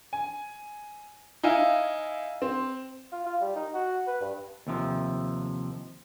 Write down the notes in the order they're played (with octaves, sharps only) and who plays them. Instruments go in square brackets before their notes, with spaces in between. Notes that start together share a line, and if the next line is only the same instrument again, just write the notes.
[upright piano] G#5
D#4 E4 F5 G#5
C4
[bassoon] F4
F4
G3
D#4
F#4
B4
G2
[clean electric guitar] D#2 C3 F3